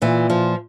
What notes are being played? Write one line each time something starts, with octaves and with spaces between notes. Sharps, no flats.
A#2 E3
F3